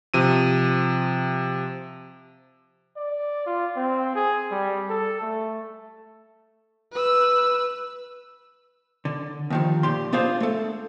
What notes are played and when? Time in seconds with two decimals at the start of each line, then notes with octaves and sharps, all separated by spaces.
0.14 C3 F3 D#7
2.97 D5
3.46 F4
3.76 C4
4.15 G#4
4.51 G3
4.89 A4
5.21 A3
6.92 B4 E6
9.05 D3
9.50 D#2 D#3 F3
9.83 A#2 G4 C6
10.13 B3 D4 F4 G#4 C5
10.40 A3 A4